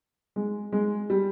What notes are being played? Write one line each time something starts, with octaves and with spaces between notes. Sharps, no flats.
G#3
G#3
G3